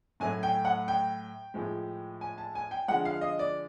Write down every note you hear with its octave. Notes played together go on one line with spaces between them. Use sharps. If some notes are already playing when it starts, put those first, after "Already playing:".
A2 F#3 A3 G#5
G5
F#5
G5
A2 F3 G#3
G#5
A5
G#5
G5
D3 F3 G#3 F#5
F5
D#5
D5